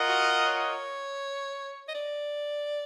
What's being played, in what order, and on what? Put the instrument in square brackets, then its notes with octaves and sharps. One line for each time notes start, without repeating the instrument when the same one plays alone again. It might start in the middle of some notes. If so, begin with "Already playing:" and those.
Already playing: [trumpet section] F4 A#4 D#5 F#5
[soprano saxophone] F#4
C#5
D#5
D5